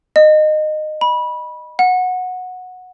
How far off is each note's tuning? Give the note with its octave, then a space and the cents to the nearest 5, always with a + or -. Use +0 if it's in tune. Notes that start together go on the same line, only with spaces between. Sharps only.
D#5 -20
B5 -20
F#5 -15